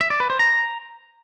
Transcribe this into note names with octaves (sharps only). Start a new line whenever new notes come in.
E5
D5
B4
C5
A#5